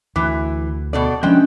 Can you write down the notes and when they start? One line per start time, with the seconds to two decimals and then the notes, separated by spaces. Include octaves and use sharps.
0.16 D2 E3 D6
0.93 B2 A4 D5
1.23 F3 F#3 G#3 C#4 D4 G5